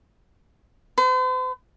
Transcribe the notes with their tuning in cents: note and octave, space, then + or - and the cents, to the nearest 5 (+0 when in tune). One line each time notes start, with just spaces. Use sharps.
C5 -45